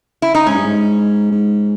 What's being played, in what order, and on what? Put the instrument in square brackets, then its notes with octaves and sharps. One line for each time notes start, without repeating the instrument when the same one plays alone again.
[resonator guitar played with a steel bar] E4
D#4
[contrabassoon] G#2 [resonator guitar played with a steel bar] C#4
[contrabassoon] G2
G#2
G#2